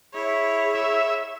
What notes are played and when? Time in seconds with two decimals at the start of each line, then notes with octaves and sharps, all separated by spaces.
0.14 E4 G#4 C#5
0.75 E5